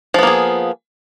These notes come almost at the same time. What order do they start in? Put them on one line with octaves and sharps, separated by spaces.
F3 B3 A#3 G#4